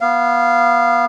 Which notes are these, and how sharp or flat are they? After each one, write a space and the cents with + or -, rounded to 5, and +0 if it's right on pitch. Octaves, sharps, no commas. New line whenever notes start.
B3 -25 F5 -15